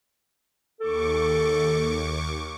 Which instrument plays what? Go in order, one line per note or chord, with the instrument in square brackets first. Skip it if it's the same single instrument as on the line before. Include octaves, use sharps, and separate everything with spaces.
[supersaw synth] D#2 C#6 D6 [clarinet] A4